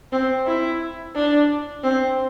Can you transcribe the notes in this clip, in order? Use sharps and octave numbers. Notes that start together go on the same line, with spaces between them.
C4
E4
D4
C4